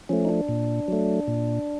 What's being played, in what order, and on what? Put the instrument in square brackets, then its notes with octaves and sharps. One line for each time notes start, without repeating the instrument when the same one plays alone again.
[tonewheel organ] F3 A3 C#4
D#4
D4
A#2
F#3 A3
A#2